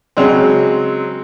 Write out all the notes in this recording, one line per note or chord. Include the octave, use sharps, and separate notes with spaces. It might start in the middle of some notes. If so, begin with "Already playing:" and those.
C#3 F#3 G#3 C4